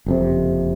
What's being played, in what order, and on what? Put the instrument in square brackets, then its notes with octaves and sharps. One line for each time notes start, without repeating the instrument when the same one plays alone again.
[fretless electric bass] F#1 F2 C3